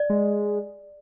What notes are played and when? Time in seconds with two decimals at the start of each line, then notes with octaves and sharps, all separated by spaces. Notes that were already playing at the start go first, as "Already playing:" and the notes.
Already playing: D5
0.10 G#3